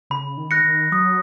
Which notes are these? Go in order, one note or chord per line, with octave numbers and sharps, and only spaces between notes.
C#3 B5
D#3
F#6 A#6 C#7
D#3
F#3 D#6